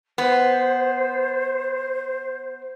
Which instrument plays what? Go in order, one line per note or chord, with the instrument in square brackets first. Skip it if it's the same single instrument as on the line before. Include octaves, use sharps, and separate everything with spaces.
[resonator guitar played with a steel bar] B3 [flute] C5